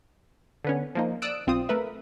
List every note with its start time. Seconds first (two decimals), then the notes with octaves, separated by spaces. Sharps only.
0.64 D3 B3 C#4
0.95 F3 A#3 D#4
1.22 D5 D#6 E6 F#6 D7
1.47 B1 C4 F4 D#6
1.69 A3 A#4 B4 E5